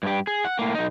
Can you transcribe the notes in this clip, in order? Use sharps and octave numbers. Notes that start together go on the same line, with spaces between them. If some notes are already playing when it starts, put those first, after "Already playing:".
G2 G4
G#4
F#5
A2 A#3
B1 D#4